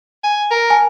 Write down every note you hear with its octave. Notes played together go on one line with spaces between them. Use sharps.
G#5
A#4
G#5 A5